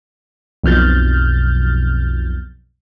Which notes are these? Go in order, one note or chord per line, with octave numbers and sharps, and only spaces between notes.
B1 F2 F6 G6 A6